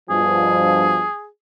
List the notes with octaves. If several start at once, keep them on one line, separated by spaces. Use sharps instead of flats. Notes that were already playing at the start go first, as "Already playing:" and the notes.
G2 B2 F3 G#4